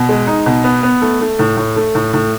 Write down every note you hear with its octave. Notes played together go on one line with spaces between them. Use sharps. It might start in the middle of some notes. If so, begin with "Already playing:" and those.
Already playing: B2
G#3
D#4
B2
B3
B3
A3
A3
A2
A2
A3
A2
A2